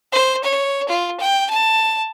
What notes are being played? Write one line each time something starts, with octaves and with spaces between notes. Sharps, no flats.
C5
C#5
F4
G5
A5